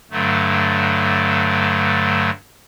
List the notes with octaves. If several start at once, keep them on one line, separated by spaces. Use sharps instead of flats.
G2 D3 F#3 A3